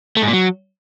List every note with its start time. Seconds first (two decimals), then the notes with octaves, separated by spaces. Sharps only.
0.17 A3
0.22 G#2
0.28 A#2
0.33 F#3